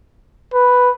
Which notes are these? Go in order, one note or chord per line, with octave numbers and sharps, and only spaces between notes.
B4